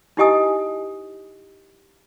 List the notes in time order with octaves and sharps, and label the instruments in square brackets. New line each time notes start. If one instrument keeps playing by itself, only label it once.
[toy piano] D#4 E4 G4 D#5 G#5 D#6